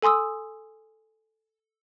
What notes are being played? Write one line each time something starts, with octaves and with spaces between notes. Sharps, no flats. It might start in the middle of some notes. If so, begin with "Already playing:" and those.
A4 G#5 C6 D#6 E6